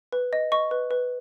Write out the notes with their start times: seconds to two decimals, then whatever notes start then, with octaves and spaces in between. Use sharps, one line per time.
0.13 B4
0.33 D#5
0.52 D#5 C#6
0.71 B4
0.91 B4